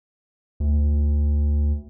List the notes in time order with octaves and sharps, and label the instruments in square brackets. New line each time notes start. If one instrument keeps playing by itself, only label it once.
[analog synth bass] D2